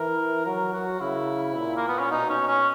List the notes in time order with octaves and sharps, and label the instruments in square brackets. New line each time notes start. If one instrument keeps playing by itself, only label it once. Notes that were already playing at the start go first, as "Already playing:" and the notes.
Already playing: [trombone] E3 [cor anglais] A#4
[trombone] F#3 [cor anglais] A#4
[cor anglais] F#4
[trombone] C#3 [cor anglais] E4
[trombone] A#2
[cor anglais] A#3
B3
C#4
[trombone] B2 [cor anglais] D#4
[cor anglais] C#4
C#4